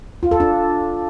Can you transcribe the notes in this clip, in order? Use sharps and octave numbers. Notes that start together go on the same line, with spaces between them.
F4
A4
D4